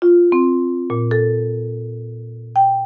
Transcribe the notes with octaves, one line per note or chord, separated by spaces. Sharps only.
F4
C4
A#2
A4
G5